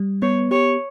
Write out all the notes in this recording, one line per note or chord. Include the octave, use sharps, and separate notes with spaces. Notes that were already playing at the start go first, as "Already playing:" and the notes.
Already playing: G3
B3 C#5
G4 C#5